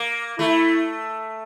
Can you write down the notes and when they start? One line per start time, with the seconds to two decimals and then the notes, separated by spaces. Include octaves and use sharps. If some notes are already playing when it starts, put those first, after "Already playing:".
Already playing: A#3
0.39 A3 E4